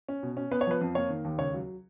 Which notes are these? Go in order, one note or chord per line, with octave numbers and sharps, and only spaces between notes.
C#4
B2
C#4
B3 B4
C#5
F3 B4
F2
A#3 C#5
D#3
D#2
C#2 C#5
F#3